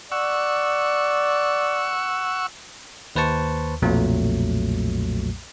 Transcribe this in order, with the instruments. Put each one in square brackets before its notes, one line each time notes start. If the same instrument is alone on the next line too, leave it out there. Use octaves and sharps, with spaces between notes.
[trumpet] D5 [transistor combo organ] F#5 C#6 E6
[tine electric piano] D#2 B4 C5 A5 C#6
B1 F2 A#2 F#3 A3